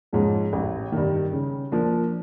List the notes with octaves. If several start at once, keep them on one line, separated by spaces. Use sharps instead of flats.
G#2 F3 G#3 C#4
A1
G2 D#3
C#3
F3 A#3 D4